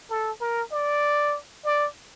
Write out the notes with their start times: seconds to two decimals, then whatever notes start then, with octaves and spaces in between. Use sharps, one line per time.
0.10 A4
0.41 A#4
0.72 D5
1.65 D5